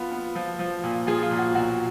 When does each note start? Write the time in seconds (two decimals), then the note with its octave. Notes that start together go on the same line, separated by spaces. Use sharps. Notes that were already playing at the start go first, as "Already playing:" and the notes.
Already playing: F3 B3 F4
0.12 B3
0.35 F3
0.59 F3
0.84 A#2
1.07 F3 F4 G#4
1.23 F4
1.31 A#2
1.39 F#4
1.55 B1 F#4